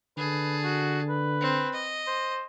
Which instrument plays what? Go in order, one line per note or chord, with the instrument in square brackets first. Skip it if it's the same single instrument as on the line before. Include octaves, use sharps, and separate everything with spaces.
[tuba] D3 [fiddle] G#4 A5 [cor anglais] B4
[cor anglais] F#4
B4
[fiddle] C4
D#5
[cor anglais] C5